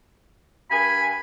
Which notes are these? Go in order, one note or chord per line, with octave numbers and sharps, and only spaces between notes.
G2 A#4 G#5 B5